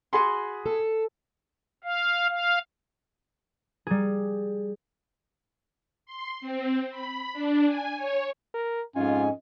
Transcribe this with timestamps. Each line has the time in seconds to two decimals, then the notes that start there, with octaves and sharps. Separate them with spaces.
0.13 F#4 G#4 G#5 B5 C6
0.66 A4
1.84 F5
2.29 F5
3.87 G3 G#4
6.06 C6
6.41 C4
6.90 B5
7.33 D4
7.66 G#5
7.96 C#5
8.54 A#4
8.96 F2 G#2 C#4 F4 D#5 G#5